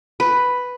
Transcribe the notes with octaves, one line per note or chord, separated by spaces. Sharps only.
B4